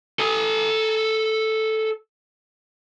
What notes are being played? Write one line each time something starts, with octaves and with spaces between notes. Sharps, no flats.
A4 G#5